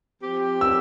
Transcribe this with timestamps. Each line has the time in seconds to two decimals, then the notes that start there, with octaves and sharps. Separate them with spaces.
0.21 F3 C4 G4
0.61 E6